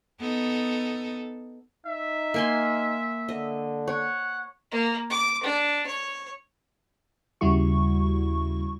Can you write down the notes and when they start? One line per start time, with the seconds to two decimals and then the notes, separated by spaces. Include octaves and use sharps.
0.21 B3 D#4 A4
1.86 D#4 E5
2.34 A#3 G#5 C6
3.29 D3 D#5
3.88 C#5 F#5
4.72 A#3
5.10 D6
5.43 D4
5.87 C#5
7.41 D#2 C#3 G3 E4 F#4 C#6